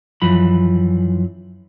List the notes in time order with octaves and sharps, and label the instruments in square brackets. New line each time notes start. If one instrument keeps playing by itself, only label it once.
[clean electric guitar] F#2 E3 F3 B5